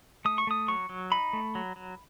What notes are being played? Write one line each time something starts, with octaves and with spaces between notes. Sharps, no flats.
A3 D#6
C#6
A3 D#6
F#3 C#6
F#3
D#4 B5
A3
F#3
F#3